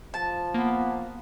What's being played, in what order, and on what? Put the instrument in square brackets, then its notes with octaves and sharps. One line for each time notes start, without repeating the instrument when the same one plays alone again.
[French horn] F3 [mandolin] A5
[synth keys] A#3 [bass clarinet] B3